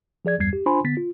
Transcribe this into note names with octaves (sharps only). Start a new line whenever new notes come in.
F3 G#4 D5 G#6
A1 E2 G2 G3 G#6 C7
G4
D4 F4 C5 G#5 B5 C6
D3 B3 A6 B6
F4